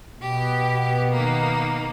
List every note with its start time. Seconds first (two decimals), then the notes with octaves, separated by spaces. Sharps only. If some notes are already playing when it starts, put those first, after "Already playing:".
0.21 B2 B3 G4
1.11 D#3 A#3